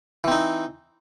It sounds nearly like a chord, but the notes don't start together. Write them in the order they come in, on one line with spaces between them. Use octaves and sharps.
E3 C4 D#4